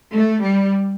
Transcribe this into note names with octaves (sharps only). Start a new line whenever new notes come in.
A3
G3